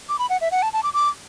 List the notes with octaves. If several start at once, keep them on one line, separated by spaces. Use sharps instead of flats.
D6
B5
F#5
E5
F#5
A5
A5
D6
D6